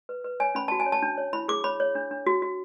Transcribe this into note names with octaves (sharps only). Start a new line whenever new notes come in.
B4
B4
C#5 G#5
C#4 B5
F#4 A5
G#5
C#5
A5
D4
C#5
E4 B5
G#4 D6
C#5 B5
C#5
D4
D4
F#4
F#4